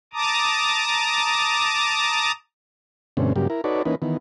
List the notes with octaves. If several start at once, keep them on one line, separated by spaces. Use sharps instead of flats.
A5 A#5 D6 D#6
G2 B2 D3 A3 C4 C#4
G2 C#3 F#3 A#3 G4
E4 A#4
D#4 F#4 A4 B4 C#5 D5
E3 A#3 C#4 D#4 B4
D#3 E3 B3